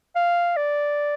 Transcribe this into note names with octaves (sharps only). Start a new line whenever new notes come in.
F5
D5